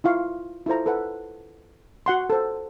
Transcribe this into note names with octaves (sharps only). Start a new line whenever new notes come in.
E4 F4 F5 C#6
E4 F4 A4 C5 A#5
A4 B4 F#5
F#4 F#5 C6
A4 C5